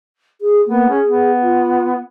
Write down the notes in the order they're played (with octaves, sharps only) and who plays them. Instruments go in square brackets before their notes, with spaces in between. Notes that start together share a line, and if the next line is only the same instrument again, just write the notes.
[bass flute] G#4
[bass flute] A#3 [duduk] B3
[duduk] C#4 [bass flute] G#4
[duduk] B3
[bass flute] F4